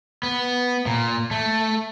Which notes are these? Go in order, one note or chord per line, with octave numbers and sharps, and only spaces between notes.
B3
A#2
A3